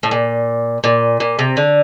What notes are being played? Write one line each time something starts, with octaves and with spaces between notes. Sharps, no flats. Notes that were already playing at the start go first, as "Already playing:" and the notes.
A2
A#2
A#2
A#2
C3
D3